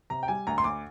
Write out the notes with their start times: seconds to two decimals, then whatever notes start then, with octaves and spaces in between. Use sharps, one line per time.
0.10 C3 A#5
0.23 G5
0.28 G3 G#5
0.47 D2 A#5
0.58 C6
0.64 D2 D6